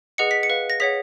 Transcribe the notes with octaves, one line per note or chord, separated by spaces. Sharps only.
G#4 B4 D#5 F#5 C#7
B6
C#7
B4 F5
A#6
G#4 C#5 F#5 B6